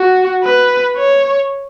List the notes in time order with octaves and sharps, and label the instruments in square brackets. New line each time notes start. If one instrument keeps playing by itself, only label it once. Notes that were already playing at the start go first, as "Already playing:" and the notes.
Already playing: [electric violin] F#4
B4
C#5